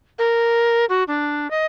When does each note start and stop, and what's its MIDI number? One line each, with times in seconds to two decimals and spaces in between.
0.18 0.85 70
0.89 1.03 66
1.08 1.50 62
1.51 1.66 75